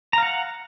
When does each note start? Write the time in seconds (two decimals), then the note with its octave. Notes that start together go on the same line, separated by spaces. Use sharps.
0.13 A#5
0.18 F5
0.23 F#5